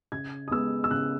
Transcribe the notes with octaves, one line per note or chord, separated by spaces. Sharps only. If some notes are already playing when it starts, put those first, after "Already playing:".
C#3 G#6
D#6
G#3 B3 E6
E6
C#3 F#6